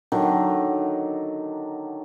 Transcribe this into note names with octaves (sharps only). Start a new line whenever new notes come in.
D3 D#3 F#3